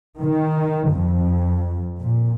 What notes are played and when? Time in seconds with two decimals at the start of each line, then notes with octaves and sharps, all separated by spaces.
0.20 D#3
0.91 F2
1.99 A#2